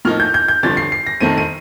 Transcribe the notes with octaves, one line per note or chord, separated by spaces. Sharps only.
A2 F3 A#3 D#4 F6
G6
G6
G6
G1 G2 F3 A6
C7
C7
A#6
F2 D#3 A3 C4 D#7
D#7